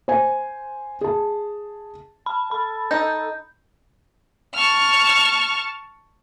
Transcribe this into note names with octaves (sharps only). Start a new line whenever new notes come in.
C5 G#5
G#4 A5
A5 B5
A4 B5
D#4 G6
A5 C#6 F6